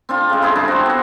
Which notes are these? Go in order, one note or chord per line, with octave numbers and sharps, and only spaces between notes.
C4 D4 F4
C#3 G#3
D4 E4 G#4 C5
G2 D4 A5
C4 F#4
B3 F#5